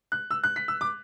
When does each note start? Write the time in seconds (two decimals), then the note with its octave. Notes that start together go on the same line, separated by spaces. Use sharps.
0.12 F#6
0.31 E6
0.44 F#6
0.56 B6
0.68 E6
0.81 D6